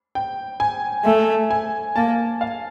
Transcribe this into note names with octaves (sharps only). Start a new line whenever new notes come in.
G5
G#5
A3 G#5
G#5
A#3 A5
F5